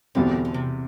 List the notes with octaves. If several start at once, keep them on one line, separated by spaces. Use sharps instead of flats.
E2 B2 D3 G3 C4
D3
C3